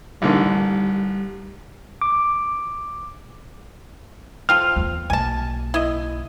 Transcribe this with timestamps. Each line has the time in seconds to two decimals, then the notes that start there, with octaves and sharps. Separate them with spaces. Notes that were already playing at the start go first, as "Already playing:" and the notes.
0.22 A1 D3 D#3 G3
2.02 D6
4.49 C4 F4 A4 F6
4.76 E2
5.10 B1 A#3 G#5 A5
5.74 E4 D#5